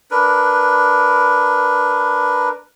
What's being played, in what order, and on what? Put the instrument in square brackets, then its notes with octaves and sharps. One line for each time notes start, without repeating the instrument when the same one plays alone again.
[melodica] D4 A#4 B4